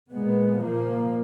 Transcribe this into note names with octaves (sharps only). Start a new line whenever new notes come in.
A#2 G#3 B3
A#2 F3 A#3